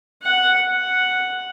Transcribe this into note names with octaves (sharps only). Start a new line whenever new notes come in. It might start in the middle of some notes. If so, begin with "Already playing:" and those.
F#5
F#5